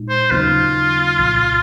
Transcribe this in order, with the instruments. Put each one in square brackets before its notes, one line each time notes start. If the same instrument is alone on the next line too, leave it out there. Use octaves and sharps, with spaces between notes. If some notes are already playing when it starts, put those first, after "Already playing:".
Already playing: [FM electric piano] A#2 G#3 D#4
[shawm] C5
[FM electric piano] D#2 C#3 F#3 A#3 D#4 [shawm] F4
[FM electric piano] C2 A#2 F3